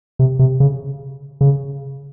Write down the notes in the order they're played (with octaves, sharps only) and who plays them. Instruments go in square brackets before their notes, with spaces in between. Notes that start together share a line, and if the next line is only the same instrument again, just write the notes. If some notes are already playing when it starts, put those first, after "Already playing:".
[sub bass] C3
C3
C#3
C#3